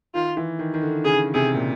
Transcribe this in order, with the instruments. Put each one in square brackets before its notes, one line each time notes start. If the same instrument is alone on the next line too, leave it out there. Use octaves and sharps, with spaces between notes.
[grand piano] D#3 [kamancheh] F4
[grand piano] E3
D#3
D#3
D3
[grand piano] C#3 [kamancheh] G#4
[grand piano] C3 [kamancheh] G#4
[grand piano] A#2